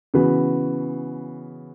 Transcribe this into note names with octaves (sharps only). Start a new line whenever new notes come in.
C#3 E3 B3 F#4 B4